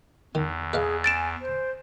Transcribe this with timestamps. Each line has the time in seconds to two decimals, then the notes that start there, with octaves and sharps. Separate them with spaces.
0.35 E2 D#3
0.73 G#4 B4 D#5 F5
1.04 G#5 A6 D7 E7
1.41 C5